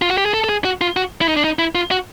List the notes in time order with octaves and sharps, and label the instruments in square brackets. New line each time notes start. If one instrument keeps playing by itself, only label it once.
[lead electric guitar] F4
F#4
G4
G#4
A4
A4
G#4
F#4
F4
F#4
E4
D#4
D4
D#4
E4
F4
F#4